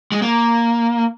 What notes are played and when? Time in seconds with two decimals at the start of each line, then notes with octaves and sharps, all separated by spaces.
0.12 G#3
0.22 A#3